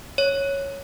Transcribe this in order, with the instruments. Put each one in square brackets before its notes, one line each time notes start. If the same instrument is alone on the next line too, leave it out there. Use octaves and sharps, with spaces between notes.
[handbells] C#5